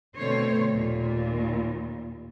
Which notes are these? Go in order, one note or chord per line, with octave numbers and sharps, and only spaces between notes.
B2 D3 A3 C4 C5 C#5
D#2 A#2